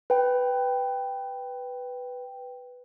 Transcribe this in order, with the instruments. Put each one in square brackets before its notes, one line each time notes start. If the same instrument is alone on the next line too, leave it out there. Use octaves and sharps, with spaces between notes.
[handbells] B4 G5